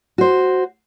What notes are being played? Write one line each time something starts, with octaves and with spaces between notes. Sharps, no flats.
F#4 C5